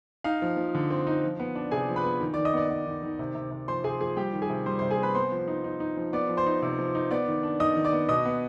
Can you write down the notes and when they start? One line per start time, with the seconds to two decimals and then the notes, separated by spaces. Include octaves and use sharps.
0.24 D#4 F5
0.42 F3
0.57 F3
0.75 D3
0.90 C4
1.07 D#4
1.24 F3
1.40 B3
1.55 D4
1.71 C3 G#4 G#5
1.89 F3
1.96 B4 B5
2.04 B3
2.21 D#3
2.34 D#3 D5 D6
2.45 D#5 D#6
2.53 B3 D5 D6
2.70 B3
2.86 D#3
3.03 D#3
3.19 C3
3.35 C3
3.51 C3
3.68 F3 C5 C6
3.84 C3 G#4 G#5
4.00 F3 G#4 G#5
4.17 G3 G4 G5
4.33 D#3
4.42 G#4 G#5
4.50 C3
4.66 G3 C5 C6
4.79 C3 C5 C6
4.91 G#4 G#5
4.98 C4 B4 B5
5.15 B3 C5 C6
5.32 F3
5.48 D#4
5.64 D#4
5.80 D#4
5.97 F3
6.13 B3 D5 D6
6.29 F3
6.37 C5 C6
6.46 D#4
6.62 C3
6.79 F3
6.95 D#4
7.11 B3 D5 D6
7.28 D#3
7.43 D4
7.60 D#3 D#5 D#6
7.77 D#3
7.85 D5 D6
7.93 B3
8.09 B2 D#5 D#6
8.25 B3